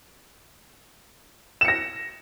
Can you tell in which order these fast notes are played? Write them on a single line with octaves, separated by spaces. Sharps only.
E7 C#7 A#6